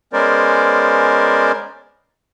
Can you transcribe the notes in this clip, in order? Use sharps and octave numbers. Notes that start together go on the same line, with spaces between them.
G#3 B3 C#4 A#4 C5 D5